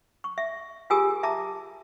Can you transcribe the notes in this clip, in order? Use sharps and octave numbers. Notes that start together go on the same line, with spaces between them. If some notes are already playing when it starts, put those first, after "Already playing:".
C#6
E5
F4 G4 G#4 A#4 G#5 D#6
E5 A5 A#5 D6